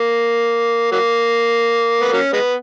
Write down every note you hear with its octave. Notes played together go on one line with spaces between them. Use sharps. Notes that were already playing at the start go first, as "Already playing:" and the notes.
Already playing: A#3
F#3 A#3
B3
F#3 A#3 C#4
G#3 B3